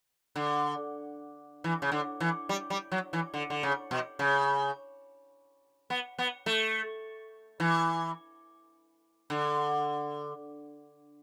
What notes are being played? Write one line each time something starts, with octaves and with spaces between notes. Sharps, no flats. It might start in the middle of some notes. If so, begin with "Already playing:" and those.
D3
E3
C#3
D3
E3
G3
G3
F#3
E3
D3
D3
C#3
B2
C#3
B3
B3
A3
E3
D3